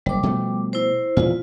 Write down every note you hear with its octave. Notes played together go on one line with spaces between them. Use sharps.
F#1 G3 D6
B2 F3 A3
E4 C5
E2 A#2 F4